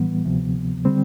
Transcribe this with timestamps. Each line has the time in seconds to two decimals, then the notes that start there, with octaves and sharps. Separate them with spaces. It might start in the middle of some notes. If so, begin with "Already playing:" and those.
Already playing: A2 E3 G3 B3
0.25 D2 C3 F3
0.85 D3 G3 C4